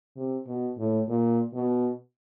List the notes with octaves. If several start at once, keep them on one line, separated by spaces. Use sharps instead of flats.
C3
B2
A2
A#2
B2